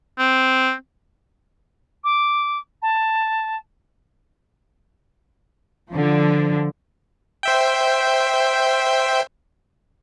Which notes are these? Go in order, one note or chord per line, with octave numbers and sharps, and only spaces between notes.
C4
D6
A5
D3 F3
C5 E5 G5